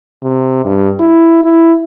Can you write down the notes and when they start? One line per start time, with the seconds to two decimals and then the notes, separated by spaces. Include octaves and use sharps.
0.23 C3
0.65 G2
0.99 E4
1.44 E4